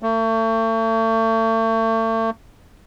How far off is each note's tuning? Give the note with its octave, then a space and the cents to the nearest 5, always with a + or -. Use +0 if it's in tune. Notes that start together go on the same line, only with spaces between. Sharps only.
A3 +40